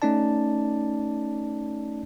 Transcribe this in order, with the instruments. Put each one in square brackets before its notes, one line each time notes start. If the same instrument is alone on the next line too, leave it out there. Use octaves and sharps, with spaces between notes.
[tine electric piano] A3 C#4 D#4 D5 A5